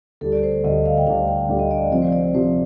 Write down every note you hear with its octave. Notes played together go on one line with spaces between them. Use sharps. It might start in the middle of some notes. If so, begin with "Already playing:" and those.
D2 D3 G3 D4 A4
D5
C5
D2 D3 G3 D4 D#5
F5
G5
D2 D3 G3 D4 F5
G5
D2 D3 G3 D4
D#5
D5
C3 F3 C4 D5
C5
D5
C3 F3 C4 C5